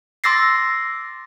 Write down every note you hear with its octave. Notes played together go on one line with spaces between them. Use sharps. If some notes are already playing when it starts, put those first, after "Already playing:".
C6 D6 E6 A6 A#6 C7